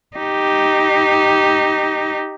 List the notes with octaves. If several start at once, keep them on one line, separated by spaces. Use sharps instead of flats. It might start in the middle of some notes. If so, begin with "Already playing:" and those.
D#4 G4